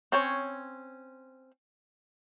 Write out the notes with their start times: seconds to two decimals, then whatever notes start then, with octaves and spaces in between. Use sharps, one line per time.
0.12 C4 C#4 C#5